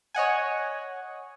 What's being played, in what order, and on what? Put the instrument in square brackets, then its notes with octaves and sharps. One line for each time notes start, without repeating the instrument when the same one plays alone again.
[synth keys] C#5 D#5 F#5 G#5